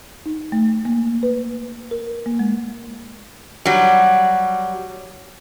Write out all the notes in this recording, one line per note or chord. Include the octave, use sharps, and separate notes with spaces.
D#4
A3
A#3
B4
A#4
A#3
G#3
F#3 G3